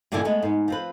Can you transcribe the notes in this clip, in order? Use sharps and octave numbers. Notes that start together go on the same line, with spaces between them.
G2 A#2 D3 E3 B3 G#5
G#3 A3 B3
G#2 B3
F3 C4 B4